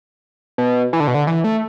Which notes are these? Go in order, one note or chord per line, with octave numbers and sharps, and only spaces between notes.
B2
E3
D3
B2
D3
E3
A3